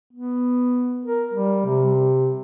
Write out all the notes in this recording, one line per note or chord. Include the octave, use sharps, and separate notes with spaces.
B3
A#4
G3
C3